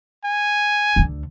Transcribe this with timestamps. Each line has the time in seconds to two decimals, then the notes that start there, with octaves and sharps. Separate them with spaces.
0.25 G#5
0.96 D2 D3